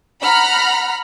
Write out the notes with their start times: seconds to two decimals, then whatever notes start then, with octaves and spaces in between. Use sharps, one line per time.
0.23 F#5 A#5 B5 F6